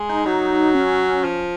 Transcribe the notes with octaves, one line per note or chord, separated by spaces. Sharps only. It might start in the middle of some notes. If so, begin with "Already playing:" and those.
Already playing: G#3
D#4
F#3 D#4
C#4
F3